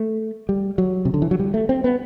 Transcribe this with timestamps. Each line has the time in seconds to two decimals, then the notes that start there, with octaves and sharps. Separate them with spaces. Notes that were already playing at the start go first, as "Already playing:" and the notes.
Already playing: A3
0.49 G3
0.78 F#3
1.05 C3
1.14 D3
1.22 E3
1.31 F#3
1.39 G3
1.54 A3
1.69 C4
1.84 B3